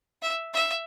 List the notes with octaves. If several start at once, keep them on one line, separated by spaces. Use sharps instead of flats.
E5
E5